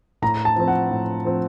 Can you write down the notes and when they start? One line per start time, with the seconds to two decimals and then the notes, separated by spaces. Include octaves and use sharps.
0.22 A2 A#5
0.45 A5
0.56 F3 C4
0.68 F#5
0.91 A2
1.25 F3 C4